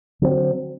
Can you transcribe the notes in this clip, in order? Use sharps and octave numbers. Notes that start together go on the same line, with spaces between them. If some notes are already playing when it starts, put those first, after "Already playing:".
D3 F#3 C4